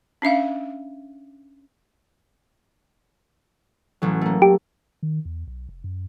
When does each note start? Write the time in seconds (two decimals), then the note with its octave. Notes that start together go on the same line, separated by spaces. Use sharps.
0.22 C#4 D4 E5 F5
4.02 A1 F#3
4.21 A3 A#3
4.42 G4
5.03 D#3
5.25 E2
5.47 B1
5.69 F1
5.84 F#2